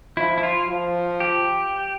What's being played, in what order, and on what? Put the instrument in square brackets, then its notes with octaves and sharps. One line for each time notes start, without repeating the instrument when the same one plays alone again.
[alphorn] F3 [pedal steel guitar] E4
[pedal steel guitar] E4
F4
[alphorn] F3
[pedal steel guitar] G4